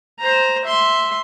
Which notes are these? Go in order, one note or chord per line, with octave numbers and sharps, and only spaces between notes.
C5 A#5
E5 C6